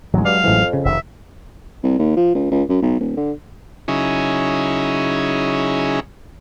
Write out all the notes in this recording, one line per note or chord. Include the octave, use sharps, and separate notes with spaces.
A1 D#2 F#3 G#3
G2 D5 F5
A1 F2 E3
C#3
F1 D#3 E5
C2
D#2
F3
C#2
C#2
F#2
B1
D#1
D3
C#3 F#3 C#4 D#4 E4 G#4